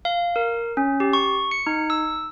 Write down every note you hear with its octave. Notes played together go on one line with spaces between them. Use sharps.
F5
A#4
C#4
G4
C#6
C#7
D#4
E6